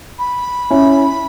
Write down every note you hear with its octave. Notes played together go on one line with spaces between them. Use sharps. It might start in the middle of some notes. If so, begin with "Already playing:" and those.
B5
C#4 E4